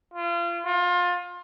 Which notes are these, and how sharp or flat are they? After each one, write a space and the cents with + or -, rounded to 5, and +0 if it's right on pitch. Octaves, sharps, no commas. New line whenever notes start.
F4 -30
F4 +25